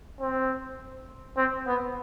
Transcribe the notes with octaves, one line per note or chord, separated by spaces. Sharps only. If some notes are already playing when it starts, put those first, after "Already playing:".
C4
C4
B3